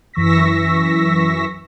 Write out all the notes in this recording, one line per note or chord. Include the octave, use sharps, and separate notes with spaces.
F#2 E3 C#6 E6 A#6 B6